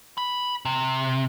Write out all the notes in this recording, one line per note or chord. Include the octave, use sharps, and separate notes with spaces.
B5
C3